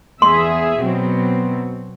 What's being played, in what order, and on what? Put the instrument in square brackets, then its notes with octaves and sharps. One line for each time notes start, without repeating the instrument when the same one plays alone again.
[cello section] E2 G#4 E5 [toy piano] C6
[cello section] B2 F#3 C4